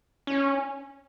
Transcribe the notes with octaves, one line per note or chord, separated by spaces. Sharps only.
C#4